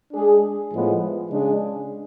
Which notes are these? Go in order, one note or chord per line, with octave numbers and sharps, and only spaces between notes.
G#3 D4 G#4
A2 F3 G#3 B3
C#3 G#3 D4 G#4